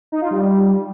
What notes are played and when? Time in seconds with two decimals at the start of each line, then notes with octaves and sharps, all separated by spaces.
0.12 D#4
0.21 F4
0.31 G3